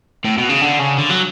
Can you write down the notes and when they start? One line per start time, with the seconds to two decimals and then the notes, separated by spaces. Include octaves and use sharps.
0.25 A2
0.38 B2
0.49 C#3
0.62 D3
0.79 C#3
0.98 D3
1.10 F#3